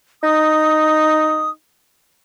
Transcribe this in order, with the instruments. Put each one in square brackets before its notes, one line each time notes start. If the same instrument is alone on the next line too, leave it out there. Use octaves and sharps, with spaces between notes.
[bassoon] D#4 [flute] D#6